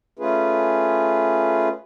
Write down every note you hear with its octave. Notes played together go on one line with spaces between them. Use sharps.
A3 C#4 F4 G#4 B4